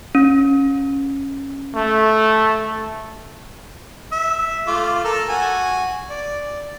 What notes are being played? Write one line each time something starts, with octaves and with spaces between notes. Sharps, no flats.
C#4
A3
E5
A3 F4 D6
A4 A#4 E6
F#4 G#5
D5